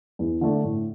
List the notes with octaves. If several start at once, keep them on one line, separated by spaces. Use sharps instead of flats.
E2
D3 A3 D4
A2